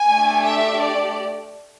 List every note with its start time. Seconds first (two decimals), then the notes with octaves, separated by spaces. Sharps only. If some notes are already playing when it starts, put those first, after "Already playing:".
Already playing: G#5
0.09 A3 D4 G4
0.44 E5
0.79 D5